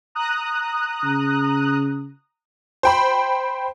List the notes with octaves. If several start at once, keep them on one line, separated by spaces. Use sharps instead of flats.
A#5 D#6 F#6
C#3
C5 G5 B5